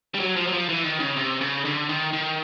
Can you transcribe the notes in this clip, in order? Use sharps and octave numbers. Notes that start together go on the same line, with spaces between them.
G3
F#3
F3
F#3
F3
E3
D#3
C#3
C3
C#3
D3
D#3
D#3